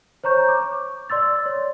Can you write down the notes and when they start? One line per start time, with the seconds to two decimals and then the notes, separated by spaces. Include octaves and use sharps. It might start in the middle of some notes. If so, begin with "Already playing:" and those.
0.24 C5 C#5 A#5 C#6 G6
0.48 D6
1.10 D5 C6 E6 A6
1.46 C#5